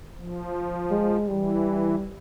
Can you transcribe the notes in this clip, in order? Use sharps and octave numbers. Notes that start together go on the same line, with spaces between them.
F3
G#3
E3 G3